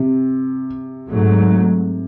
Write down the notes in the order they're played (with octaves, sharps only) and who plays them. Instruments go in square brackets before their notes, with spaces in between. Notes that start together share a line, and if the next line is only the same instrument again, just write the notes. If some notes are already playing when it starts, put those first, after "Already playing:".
Already playing: [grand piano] C3
[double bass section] G#2 F#3 A3